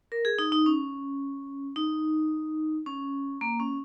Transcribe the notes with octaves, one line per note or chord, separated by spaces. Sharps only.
A#4
G#4
D#4
D#4
C#4
D#4
C#4
A#3
C#4